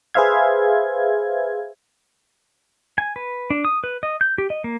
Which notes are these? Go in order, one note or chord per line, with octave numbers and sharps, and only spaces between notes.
G#4 B4 C5 E5 F5 G#6
G#5
B4
D4
D#6
B4
D#5
G6
G4
D#5
A#3